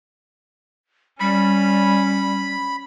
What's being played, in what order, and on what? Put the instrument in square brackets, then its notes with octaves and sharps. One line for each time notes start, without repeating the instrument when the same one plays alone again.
[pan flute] G3 [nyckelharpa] C#4 [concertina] B5